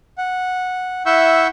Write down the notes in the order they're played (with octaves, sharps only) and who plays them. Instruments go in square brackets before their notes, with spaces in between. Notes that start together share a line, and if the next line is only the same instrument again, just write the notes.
[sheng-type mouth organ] F#5
E4 E5 F#5 C#6 E6 G6